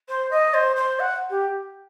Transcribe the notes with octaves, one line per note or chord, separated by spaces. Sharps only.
C5
D#5
C5
C5
F#5
G4